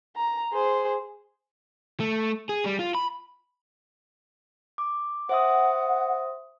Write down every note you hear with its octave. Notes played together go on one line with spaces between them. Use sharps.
A#5
G#4 C5
A3
G#4
G3
F4
B5
D6
C5 E5 F#5 D#6